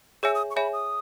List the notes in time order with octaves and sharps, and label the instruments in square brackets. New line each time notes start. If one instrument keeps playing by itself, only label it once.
[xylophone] G#4 C#5 E5 G#5 [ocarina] E6
[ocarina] D#6
C#6
[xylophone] G#4 C#5 E5 G#5 [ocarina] B5
[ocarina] D#6